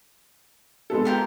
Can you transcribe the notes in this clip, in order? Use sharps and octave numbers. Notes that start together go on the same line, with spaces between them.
G#3 B3 A4
F4 G4 A#4